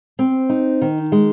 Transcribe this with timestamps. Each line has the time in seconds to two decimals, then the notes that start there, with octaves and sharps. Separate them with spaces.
0.19 C4
0.49 D#4
0.82 D#3
1.12 G#3